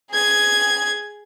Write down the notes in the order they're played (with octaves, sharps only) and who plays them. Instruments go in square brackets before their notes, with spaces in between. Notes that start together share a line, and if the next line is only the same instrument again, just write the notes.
[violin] G#4 G#6